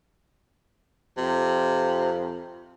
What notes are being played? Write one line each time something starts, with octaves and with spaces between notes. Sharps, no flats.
F2 C3